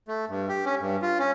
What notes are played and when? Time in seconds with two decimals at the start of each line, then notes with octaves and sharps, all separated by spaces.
0.08 A3
0.29 G2
0.49 G4
0.65 C#4
0.81 G2
1.02 F4
1.19 C#4